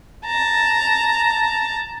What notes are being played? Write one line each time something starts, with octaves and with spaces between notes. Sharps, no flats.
A5 A#5